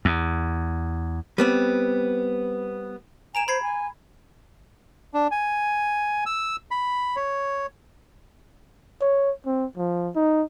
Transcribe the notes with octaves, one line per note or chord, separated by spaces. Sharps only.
E2
G3 B3 C4
G#5 A#5 D7 E7
C5 B5 G#6 C7
G#5
D4
G#5
E6
B5
C#5
C#5
C4
F3
D#4